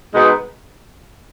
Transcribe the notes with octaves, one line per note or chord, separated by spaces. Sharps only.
B2 G#3 B3 D#4